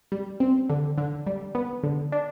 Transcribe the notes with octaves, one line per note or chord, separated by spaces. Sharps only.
G3
C4
D3
D3
G3
B3
D3
D4